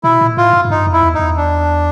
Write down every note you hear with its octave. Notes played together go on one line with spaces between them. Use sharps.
B2 E4
A#2
A2 F4
G#2
G#2
G2 D#4
F2
E4
E2
E2 D#4
D4